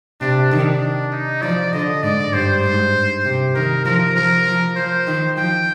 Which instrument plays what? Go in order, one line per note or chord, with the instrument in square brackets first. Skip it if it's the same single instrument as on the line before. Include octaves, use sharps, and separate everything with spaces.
[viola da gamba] C3 [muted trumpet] D4
[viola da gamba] D#3 [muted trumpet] D4
[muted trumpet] D#4
[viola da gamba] F3 [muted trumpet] D5
[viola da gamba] D3 [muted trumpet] D#5
[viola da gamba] G#2 [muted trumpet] D5
[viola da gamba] G2 [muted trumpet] C5
[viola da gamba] G#2
C3
[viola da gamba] D#3 [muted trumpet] A#4
[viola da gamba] F3 [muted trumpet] A#4
[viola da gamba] F3 [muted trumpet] A#4
[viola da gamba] F3
[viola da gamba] F3 [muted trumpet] C5
[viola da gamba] D#3
[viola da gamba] F3 [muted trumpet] G5